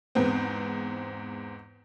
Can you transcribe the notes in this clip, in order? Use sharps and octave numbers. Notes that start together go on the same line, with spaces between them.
E2 G#2 B3 C4